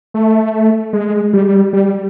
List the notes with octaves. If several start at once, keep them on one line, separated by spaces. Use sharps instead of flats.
A3
G#3
G3
G3